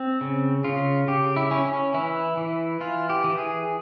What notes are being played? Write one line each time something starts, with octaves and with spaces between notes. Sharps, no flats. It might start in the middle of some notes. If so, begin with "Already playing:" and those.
Already playing: C4
C#3
C#3 F4
C#3 G4
E4
C#4
C#4
E3 E4
E3
E3 F4
G4
E3
G#4